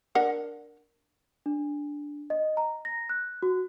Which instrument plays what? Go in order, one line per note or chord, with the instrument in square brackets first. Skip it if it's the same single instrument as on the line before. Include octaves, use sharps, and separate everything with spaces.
[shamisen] D4 A#4 F#5
[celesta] D4
D#5
A#5
A#6
F#6
F#4